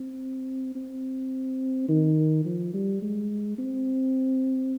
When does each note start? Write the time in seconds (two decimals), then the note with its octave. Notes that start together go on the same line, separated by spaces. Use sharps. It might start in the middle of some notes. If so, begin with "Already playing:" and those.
Already playing: C4
0.76 C4
1.89 D#3
2.45 F3
2.74 G3
3.02 G#3
3.59 C4